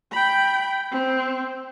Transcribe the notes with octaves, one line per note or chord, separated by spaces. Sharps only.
G5 B5
C4